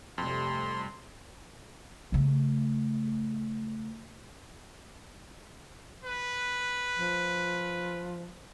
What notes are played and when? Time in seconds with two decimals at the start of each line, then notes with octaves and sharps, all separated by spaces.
0.18 F2 C3 G3 A3 C6
2.12 C#3 A3
6.05 B4
6.99 F3